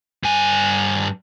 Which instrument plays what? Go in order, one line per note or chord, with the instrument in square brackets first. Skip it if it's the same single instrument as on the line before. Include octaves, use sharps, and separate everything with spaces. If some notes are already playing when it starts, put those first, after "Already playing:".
[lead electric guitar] G2 G#5